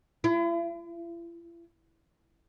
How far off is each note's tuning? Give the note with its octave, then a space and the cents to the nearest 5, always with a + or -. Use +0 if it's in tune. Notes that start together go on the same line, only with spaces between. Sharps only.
E4 +45